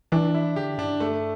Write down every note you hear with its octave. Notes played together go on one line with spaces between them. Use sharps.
E3 D4
E4
D3 G4
G2 D4
A3